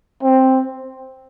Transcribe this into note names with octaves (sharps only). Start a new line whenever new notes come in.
C4